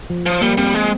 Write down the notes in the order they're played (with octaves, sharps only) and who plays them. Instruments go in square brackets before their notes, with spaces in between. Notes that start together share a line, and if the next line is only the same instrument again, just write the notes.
[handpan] F3
[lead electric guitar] F3
[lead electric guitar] G3 [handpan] A#3
[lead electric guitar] G3 [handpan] C4
[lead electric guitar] G#3